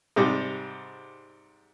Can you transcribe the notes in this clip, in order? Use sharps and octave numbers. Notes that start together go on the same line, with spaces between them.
G#2 C3 G3